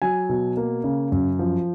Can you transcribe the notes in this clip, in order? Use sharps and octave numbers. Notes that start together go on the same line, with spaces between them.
F#3 G#5
B2
A#3
C#3
F#2
F3